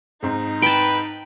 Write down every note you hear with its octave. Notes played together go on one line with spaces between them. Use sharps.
G#2 C4 D#4
B4 G5 A5